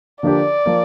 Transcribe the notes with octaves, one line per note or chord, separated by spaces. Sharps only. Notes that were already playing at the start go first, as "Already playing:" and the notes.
D3 F3 A#3 D4 G4 D5
F3 A#3